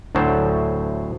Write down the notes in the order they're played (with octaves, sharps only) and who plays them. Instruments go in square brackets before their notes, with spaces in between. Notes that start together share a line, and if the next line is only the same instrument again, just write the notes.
[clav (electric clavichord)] D2 A2 F#3 C5 A5